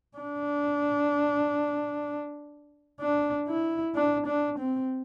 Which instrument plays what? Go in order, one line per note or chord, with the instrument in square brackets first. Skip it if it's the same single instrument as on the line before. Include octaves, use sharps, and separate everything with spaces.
[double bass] D4
D4
E4
D4
D4
C4